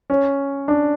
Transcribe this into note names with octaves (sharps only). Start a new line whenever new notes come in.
C#4
D4